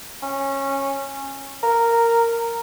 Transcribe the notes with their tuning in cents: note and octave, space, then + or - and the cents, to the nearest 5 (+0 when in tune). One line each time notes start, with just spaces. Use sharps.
C#4 -15
A#4 -10